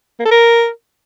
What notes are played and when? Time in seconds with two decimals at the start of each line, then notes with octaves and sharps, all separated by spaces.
0.19 A#3
0.25 A4
0.31 A#4